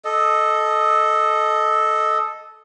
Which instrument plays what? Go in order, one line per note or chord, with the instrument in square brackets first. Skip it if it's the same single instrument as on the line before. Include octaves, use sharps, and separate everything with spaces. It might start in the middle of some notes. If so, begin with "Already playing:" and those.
[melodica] A4 D#5